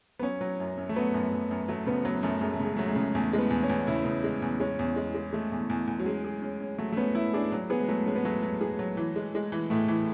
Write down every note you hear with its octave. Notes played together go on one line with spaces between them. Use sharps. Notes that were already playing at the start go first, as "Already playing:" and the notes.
B3
F#3 C#4
F#3
F#2
F#2
A3
F#3 B3
F#2
F#2
F#2
F#3 A3
C#3 B3
F#3 B3
F#2 A3
F#2 G#3
A3
C#3 G#3
F#3 A3
G#3
C#3
E2 A3
G#3
B3
E2
C#4
E2
C#3 E4
C#3
G#3
E2
G#3 C#4
E2
G#3
G#3
G#3 A3
E2
E2
E2
F#3
G#3 C#4
G#4
C#4
C#4
F#3 A3
A3
B3 C#4
C#4 E4
D4 G#4
F#3
B3 G#4
G#3
F#3 A3
G#3 C#4
B3
F#3 A3
F#3
G#4
F#3
E3
G#3
G#3
E3
A2 A3
E3